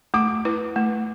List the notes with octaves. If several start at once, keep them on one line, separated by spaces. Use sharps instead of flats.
A3 D6
E4 B4
A3